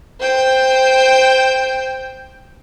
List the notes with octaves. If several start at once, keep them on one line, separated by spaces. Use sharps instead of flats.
C5 G5